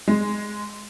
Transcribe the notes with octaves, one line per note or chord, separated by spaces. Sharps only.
G#3